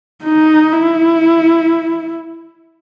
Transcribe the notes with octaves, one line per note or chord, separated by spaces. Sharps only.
D#4
E4